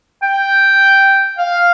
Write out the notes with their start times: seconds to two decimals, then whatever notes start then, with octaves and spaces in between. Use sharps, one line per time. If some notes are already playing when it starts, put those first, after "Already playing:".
0.22 G5
1.39 F5